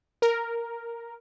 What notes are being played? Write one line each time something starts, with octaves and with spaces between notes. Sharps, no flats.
A#4